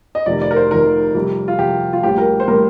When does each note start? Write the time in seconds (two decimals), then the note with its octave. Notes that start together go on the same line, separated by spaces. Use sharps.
0.15 D#5
0.26 F1 F2 C3 D#3 D5
0.42 D5
0.51 A#4
0.56 C5
0.71 F1 F2 C3 D#3 A#4
1.15 F2 C3 G3
1.48 F4
1.59 F2 C3 G3 G4
1.93 F4
2.03 A#1 A2 G3 G4
2.18 A#4
2.40 C5
2.48 A2 G3 A#4